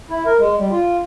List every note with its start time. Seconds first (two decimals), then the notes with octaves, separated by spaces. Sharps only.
0.10 E4
0.26 A#4
0.40 G#3
0.58 G3
0.71 F4